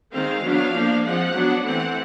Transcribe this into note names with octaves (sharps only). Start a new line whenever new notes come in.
D#3 G#3 C4 F5
F#3 B3 D4
F3 A#3 D4
F3 G#3 C4 F#5
F#3 B3 D4
E3 A3 C4 F#5